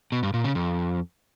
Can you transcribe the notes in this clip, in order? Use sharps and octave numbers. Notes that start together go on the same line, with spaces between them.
B2
G2
A#2
C#3
F2